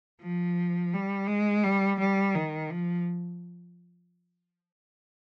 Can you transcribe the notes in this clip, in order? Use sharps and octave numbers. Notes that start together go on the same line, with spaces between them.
F3
G3
G#3
G3
G3
D#3
F3